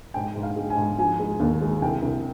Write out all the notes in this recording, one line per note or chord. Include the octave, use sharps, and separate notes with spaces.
G#2 G5
G#2
F5
G#3
G#5
G#2
F3 G#5
G#3
D#2
G#3
C2 G5
C2